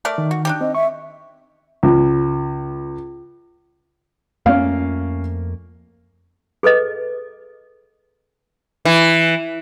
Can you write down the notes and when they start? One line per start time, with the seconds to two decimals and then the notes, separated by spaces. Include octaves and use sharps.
0.05 A3 A#4 D5
0.18 D#3
0.31 F#4
0.45 D4 D#4 G4
0.61 C4 D#5
0.75 E5 C#6
1.83 C#2
4.46 F2 A3 A#3 C#4 F5
6.63 G#4 A4 B4 D#5
8.85 E3